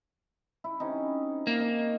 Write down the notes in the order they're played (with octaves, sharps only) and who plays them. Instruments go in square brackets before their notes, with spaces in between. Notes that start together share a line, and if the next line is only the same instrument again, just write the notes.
[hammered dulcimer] E4
C3 C#4 D#4
[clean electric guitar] A#3 [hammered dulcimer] E5
[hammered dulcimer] D#4